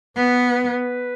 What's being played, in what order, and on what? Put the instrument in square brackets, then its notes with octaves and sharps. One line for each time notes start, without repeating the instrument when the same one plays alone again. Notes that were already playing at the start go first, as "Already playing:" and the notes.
[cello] B3 [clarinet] B4